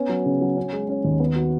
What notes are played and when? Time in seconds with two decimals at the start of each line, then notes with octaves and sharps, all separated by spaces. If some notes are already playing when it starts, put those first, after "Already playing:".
Already playing: B3 C#4
0.09 F#3
0.26 C#3
0.41 F#3
0.57 C#4
0.73 G#3
0.89 C#4
1.04 D#2
1.20 B3
1.36 F#4